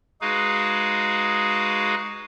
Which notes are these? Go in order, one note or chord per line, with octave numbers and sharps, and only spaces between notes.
G#3 D#4 F#4 G#4 B4 F5